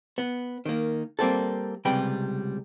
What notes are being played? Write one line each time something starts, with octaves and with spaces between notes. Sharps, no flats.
B3
D#3 A#3
G3 A#3 C4 A4
C#2 C3 G3 B4 G5 B5